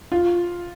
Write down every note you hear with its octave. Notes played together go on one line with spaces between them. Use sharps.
F4